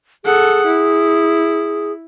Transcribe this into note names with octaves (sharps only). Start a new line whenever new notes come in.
G#4 A4 F#5
E4